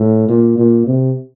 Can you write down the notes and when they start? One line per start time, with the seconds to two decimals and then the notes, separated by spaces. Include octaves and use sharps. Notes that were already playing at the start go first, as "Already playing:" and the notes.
Already playing: A2
0.29 A#2
0.58 A#2
0.87 C3